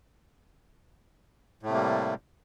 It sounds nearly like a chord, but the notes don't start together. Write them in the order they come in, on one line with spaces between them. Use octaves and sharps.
A2 A3 C3 A#3 G3